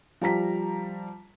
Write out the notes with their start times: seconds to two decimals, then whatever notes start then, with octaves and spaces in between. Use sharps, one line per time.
0.22 F3 G3 A#5 B6